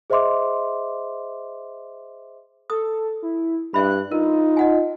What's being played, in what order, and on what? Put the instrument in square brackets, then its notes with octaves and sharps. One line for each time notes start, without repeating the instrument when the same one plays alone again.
[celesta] G#4 C5 D#5 E5 C6 D6
[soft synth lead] A4 [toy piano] D#6
[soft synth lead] E4
[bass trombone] G2 [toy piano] E5 B5 [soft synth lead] F#6
[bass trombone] D#4 [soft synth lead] F4 [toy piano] A#4
[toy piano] D#5 F#5 G#5